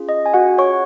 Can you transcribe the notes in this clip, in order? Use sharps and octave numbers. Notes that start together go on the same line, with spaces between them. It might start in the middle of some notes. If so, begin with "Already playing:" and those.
Already playing: C#4 F4 G#4
D#5
G#5
F#4 F#5
C#5 C#6